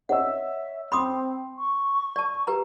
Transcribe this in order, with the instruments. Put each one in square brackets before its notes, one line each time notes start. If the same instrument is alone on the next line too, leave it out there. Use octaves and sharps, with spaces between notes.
[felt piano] C#5 D#5 E6 [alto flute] E5 [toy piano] F#5
[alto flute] C4 [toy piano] B5 D6 D#6 [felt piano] C6
[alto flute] C#6
[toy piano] D5 A5
G4 B4 A#5